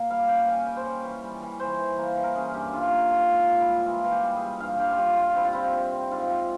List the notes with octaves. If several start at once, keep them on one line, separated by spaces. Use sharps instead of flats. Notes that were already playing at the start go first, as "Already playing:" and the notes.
Already playing: A#3
G3 F5
C#4 G5
C#4 G#5
G3 G5
C5
C#4 C#5
E3
G3
E3
E3 C5
E3
A#3
E3
A#4
C#4 G#4
G2 G4
G2 F4
A#3
G#2 F4
G#2
F4
G#2
E4
G3
E3 F4
E3
G4
G3
G#4
G3
G2 F5
G2 G4
F4
G2 G4
G2 F4
C4 E4
F4
C4 E4
C4
C4
G#2 F4
F3